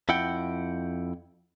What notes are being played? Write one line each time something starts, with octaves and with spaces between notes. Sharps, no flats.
F2 E4 F#5 G5